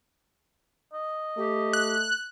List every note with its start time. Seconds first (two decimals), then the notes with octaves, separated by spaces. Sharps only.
0.93 D#5
1.37 A3 G4
1.73 F#6